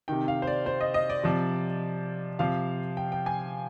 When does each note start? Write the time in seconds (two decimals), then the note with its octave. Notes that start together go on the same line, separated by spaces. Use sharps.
0.08 C3 D#3 G5
0.28 F5
0.42 C5
0.47 D5
0.66 C5
0.81 D#5
0.94 D#5
1.10 D5
1.23 C3 F3
2.39 C3 F3 F5
2.97 G5
3.12 G5
3.26 G#5